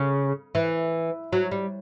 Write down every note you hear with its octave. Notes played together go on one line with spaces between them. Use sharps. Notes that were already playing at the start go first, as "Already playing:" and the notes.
Already playing: C#3
E3
F#3
G3